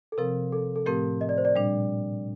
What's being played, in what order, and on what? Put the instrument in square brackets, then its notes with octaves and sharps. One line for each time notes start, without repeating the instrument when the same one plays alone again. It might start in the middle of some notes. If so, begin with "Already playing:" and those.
[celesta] A4
[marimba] C3 F3 C4 [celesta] A#4
[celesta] A4
A4
[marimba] A2 F3 A3 C4 G4 [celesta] A#4
[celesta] D#5
D5
C5
D5
[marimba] A#2 G3 D4